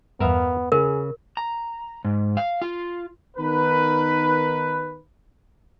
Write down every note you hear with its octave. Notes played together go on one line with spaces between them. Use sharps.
E2 G2 B3 A#4 E5 F5
C#3 G#4 A#4
A#5
G#2
F5
F4
D#3 B3 D#4 A#4 B4